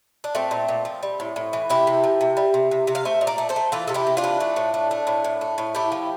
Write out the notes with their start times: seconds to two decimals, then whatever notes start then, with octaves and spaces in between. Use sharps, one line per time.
0.24 D4
0.35 A#2 A3 C4
0.51 A#2
0.68 A#2
0.85 F3
1.03 G3
1.20 A2
1.36 A2
1.53 E3
1.70 C3 E4 G4
1.87 C3
2.04 F3
2.21 C3
2.37 G3
2.54 C3
2.71 C3
2.87 C3
2.95 F5
3.05 A3 C5 E5
3.21 A#2
3.27 A#4 D5
3.38 A3
3.49 A4 C5
3.56 A3
3.72 E3 F4 A4
3.87 C3 A4
3.94 E4 G4
4.07 C3
4.17 D4 F4
4.24 E3
4.40 A3
4.56 A2
4.74 A3
4.91 A3
5.07 A2
5.24 A2
5.41 A3
5.58 A2
5.75 A3 E4 G4
5.92 F3